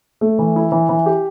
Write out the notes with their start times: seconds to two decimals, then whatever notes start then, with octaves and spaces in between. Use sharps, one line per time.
0.21 A3
0.39 E3
0.56 E4
0.72 E3
0.89 E3
1.06 G4